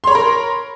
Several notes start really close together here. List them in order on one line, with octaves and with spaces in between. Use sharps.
C6 C#5 B5 A#4